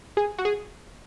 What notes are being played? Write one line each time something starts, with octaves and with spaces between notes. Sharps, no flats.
G#4
F#4
G#4